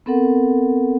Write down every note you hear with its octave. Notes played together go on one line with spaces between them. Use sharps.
B3 C4 A4 A#4 F#5